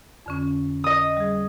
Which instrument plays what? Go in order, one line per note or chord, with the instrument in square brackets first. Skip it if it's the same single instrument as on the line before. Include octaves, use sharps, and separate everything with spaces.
[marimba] F2 D3 C#4
[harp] D#5 D#6
[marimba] G3 G#4